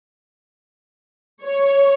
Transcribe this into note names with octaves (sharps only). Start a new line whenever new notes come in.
C#5